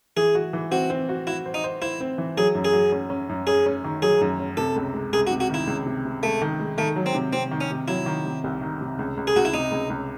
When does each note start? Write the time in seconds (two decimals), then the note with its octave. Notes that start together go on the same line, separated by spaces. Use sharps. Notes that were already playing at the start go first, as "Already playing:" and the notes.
0.16 E3 G#4
0.35 F#4
0.53 E3
0.71 C4 F#4
0.90 C4
1.09 F#4
1.27 E4 F#4
1.46 C5
1.54 D#4
1.64 C5
1.82 E4 C5
2.01 C4
2.18 E3
2.37 F#3 G#4
2.55 F#2
2.65 G#4
2.73 F#3
2.92 C#4
3.10 C#4
3.29 F#2
3.47 C#4 G#4
3.66 C#4
3.84 D#3
4.02 F#3 G#4
4.21 F#2
4.39 C#4
4.57 C3 A4
4.76 C#2
4.94 G#3
5.12 C#2 G#4
5.27 F#4
5.31 C3
5.40 F#4
5.49 D#3 E4
5.67 C#2
5.86 C3
6.05 C3
6.22 G#3 A3
6.42 D#3
6.60 G#3
6.78 D#3 A3
6.96 F#3
7.06 C4
7.15 C3
7.33 C3 C4
7.51 D#3
7.61 C#4
7.70 C3
7.88 F#3 E4
8.06 D#3
8.26 C3
8.44 C2
8.61 D#3
8.81 C3
8.99 C#2
9.17 C#2
9.27 G#4
9.36 C#2 F#4
9.45 E4
9.53 C3 D#4
9.71 C#2
9.90 C#2